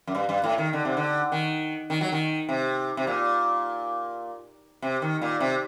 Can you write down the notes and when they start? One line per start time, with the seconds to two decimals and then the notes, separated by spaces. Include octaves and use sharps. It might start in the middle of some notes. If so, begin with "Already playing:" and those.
0.07 F#2
0.15 G2
0.29 G2
0.44 A2
0.58 D#3
0.73 D3
0.85 C3
0.97 D3
1.32 D#3
1.90 D#3
2.01 F#3
2.12 D#3
2.49 C3
2.97 C3
3.07 A#2
4.82 C3
5.02 D#3
5.22 A#2
5.40 C3